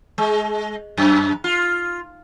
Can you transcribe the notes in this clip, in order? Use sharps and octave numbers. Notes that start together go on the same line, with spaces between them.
G#3
F#2
F4